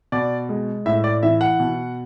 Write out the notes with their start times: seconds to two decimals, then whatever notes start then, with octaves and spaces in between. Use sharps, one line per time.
0.12 B2 D5
0.49 G#3
0.86 A2 E5
1.04 D5
1.23 E3 E5
1.41 F#5
1.60 B2